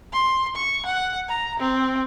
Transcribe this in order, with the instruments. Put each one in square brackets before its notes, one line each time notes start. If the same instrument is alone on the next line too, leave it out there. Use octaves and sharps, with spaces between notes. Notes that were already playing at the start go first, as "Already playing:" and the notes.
[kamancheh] C6
C#6
F#5
A#5
C4